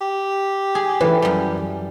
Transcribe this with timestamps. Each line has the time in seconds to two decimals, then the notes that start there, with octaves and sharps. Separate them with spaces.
0.01 G4
0.75 G#4
1.01 E3 A4 B4
1.22 F#2 G3